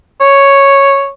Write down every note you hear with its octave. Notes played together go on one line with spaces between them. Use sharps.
C#5